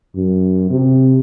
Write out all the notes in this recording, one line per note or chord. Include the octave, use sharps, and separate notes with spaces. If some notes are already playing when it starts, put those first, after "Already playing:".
F#2
C3